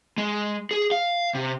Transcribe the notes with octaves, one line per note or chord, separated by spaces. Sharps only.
G#3
G#4
F5
C3